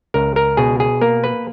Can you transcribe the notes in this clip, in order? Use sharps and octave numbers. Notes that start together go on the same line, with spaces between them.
C#2 A#4
A#4
B2 G#4
G#4
A#3 A#4
B4